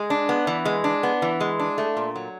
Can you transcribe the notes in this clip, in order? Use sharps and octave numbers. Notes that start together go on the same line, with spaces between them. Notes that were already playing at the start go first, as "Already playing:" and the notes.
Already playing: G#3
D4
B3
E3
G#3
D4
B3
E3
G#3
D4
A3
A#2
F#3